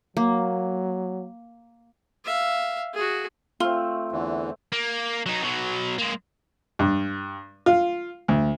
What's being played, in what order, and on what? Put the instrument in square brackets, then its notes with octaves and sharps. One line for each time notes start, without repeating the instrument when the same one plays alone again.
[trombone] F#3 [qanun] A#3
[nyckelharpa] E5 F5
F#4 G#4
[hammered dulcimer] A3 C4 [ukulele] F4
[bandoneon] E2 D3 E3
[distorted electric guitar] A#3
F#3 D#4
B2 F#3
G#3 A#3
[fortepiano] G2
F4
D2